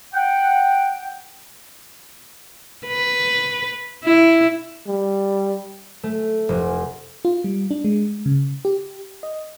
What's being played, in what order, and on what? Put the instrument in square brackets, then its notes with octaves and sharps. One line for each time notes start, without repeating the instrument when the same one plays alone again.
[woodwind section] F#5 G5
[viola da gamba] B4
E4
[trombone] G3
[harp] A3
F1
[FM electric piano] F4
G3
D4
G#3
C#3
G4
D#5